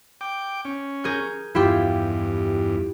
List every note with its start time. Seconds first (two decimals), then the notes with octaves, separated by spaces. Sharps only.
0.21 G5 D6
0.65 C#4
1.04 G#4 A#4 G6
1.55 E2 G2 E4 F4 G4